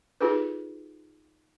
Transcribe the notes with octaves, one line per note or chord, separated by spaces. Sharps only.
D#4 F4 F#4 G#4 A4 B4